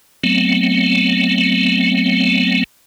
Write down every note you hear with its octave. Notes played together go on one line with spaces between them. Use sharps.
F#3 A3 B3 C4